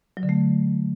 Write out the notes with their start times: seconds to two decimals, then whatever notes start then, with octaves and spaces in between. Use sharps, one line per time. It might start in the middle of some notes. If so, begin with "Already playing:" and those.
0.17 F#3
0.23 D3
0.29 A3